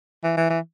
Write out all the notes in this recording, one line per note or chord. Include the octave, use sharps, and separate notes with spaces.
E3
E3
E3